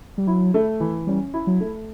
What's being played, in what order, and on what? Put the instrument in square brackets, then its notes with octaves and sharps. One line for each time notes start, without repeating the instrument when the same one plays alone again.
[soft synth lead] G3
[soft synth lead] F#3 [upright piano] E4
[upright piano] A3
E3
[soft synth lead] G3 [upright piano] C#4
[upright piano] E4
[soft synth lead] F#3
[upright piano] A3